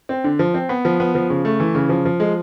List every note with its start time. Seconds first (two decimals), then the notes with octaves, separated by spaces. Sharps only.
0.09 C4
0.24 D3
0.39 F3
0.54 C4
0.69 B3
0.85 F3
1.00 B3
1.15 F3
1.30 C#3
1.45 A3
1.60 E3
1.75 C#3
1.89 F3
2.05 F3
2.20 G#3